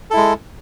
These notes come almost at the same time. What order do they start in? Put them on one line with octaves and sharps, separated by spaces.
A4 E4 G#3